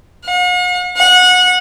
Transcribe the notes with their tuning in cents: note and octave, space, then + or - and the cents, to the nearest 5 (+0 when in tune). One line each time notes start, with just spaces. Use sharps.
F#5 -45
F#5 -25